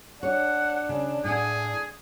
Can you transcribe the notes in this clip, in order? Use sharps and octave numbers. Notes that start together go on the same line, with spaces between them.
D4 C#5 F#5
C#3
A2 G#4 F#5 G#5